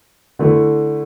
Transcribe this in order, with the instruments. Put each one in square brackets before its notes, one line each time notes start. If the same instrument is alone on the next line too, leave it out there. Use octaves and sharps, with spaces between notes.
[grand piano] D3 A3 E4